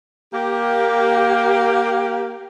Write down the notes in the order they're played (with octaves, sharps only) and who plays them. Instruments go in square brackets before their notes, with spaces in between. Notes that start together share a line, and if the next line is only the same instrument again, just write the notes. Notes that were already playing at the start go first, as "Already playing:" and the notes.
[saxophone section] A#3 G4